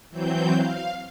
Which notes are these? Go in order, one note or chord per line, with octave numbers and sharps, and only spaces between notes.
E3 F#3 C4 G6
F5